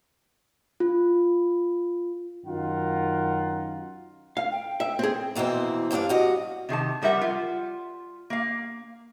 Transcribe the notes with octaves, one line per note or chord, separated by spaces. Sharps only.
F4
F#2 D#3 F4 A#4 F#5
F5
G5
E5
C4 G#4
F2 B2 E3 A#3 C4
G2 A#2 F3 D4 F5
G2 F#4 D#5
C3 D#3 G#4 A5
F3 G3 A#4 E5 F#5
F4
A#3 F5